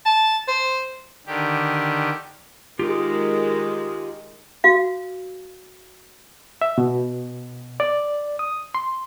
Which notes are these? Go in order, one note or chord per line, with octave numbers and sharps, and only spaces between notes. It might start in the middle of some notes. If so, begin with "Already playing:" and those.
A5
C5
D3 D#3 G4
D#3 G#3 F4 G4
F#4 F5
E5
B2
D5
D#6
C6